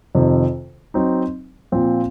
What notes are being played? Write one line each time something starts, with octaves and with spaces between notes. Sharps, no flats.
F2 C3 D#3
F#3 C4 D#4
A#2 F3 C4 F4